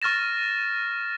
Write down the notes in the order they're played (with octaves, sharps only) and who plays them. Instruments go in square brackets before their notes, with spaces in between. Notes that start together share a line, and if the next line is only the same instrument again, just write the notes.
[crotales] C#6 F6 A6 A#6 E7